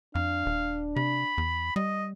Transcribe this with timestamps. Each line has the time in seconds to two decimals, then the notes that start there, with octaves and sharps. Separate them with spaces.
0.15 F2 D4 F5
0.46 D#1
0.96 C3 B5
1.38 E2
1.76 G3 D#5